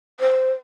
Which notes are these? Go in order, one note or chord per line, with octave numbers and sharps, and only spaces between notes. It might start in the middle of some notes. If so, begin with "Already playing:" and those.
C5